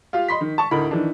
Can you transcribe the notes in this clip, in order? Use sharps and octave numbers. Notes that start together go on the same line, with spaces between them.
F4 G4 F5
D#5 B5 C6 B6
D#3
A5 C#6
D2 A2 D#4 A#4 B5
D#3 E3 D4